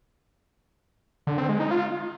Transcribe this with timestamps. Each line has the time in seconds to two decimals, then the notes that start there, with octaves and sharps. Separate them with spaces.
1.27 D3
1.38 C4
1.49 G#3
1.60 D#4
1.71 F4